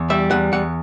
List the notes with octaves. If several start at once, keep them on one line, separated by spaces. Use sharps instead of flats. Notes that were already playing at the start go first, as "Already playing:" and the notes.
Already playing: E2
G3 E5
E2 F#5
E2 F#5